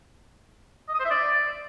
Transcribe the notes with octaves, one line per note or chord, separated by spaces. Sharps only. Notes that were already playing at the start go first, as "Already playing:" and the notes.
D#5
D#6
C5
E5
D5